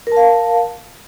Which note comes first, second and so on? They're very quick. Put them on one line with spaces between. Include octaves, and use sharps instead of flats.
A#4 A5 F5